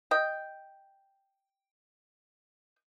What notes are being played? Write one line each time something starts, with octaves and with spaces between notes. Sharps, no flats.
D#5 G5